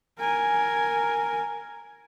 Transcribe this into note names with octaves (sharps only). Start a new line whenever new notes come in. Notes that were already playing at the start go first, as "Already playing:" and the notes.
A#4 G#5